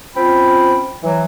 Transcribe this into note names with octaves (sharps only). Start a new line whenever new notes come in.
C4 C#4 F4 G5 B5
E3 F#3